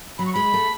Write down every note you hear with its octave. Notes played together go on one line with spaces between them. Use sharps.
F#3 B5
C#6
G#3 B5
A3